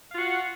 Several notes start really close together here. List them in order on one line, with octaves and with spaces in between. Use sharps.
F5 F4 F#4 F#5